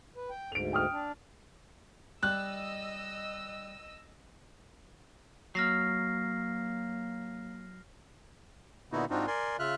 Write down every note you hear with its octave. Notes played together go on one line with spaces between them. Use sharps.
B4
G5
D2 G#2 D7 F7
G5 D#6 F6
D4
G3 D#5 E6 F#6
F#3 A#3 F6 A#6 C7
A#2 D3 B3 D#4 E4 F#4
G#2 C4 D4 D#4 F4 F#4
A#4 D5 G#5 C6
C#3 F4 E5 F6 F#6